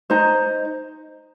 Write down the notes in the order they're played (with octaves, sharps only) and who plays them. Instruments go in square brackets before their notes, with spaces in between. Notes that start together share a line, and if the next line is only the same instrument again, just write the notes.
[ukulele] D#4 C5 D#5 A#5